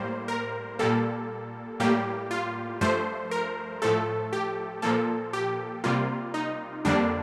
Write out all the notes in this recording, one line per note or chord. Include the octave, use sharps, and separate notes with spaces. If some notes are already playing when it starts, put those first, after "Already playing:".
Already playing: A2 G3 A#3 C5
A#4
A#2 G3 A#3 A4
A2 G3 A#3 G4
F4
G2 F3 A3 C5
A#4
A2 F3 A3 A4
G4
A#2 F3 A#3 A4
G4
C3 G3 A#3 F4
D#4
F2 D3 G3 A#3 D4